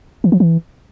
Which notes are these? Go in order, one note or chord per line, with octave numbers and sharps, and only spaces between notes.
E3
F3
E3